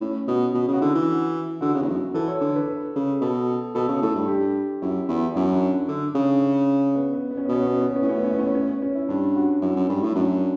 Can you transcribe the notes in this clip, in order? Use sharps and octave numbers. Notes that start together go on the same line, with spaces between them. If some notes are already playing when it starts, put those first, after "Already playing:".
A2 C#4
B2 F#4
B2
C#3
F#4
D3 E4
E3
D3 F#4
C#3
E2
F#2
E3 A4
C#5
D3
B4
B4
C#3
B2 A4
B2 A4
C#3
A2 A4
G2
G4
F#2 E4
E2
F#2 E4
D4
D4
D3
C#3
C#4
B3
B3
B3
C#4
B3
B2 C#4
B3
C#4
B3
C#4
B3
C#4
A2 B3
C#4
B3
C#4
B3
C#4
B3
C#4
C#4
C#4
E4
G2 D4
F#4
F#2 E4
F#2
G2
A2
F#2 D4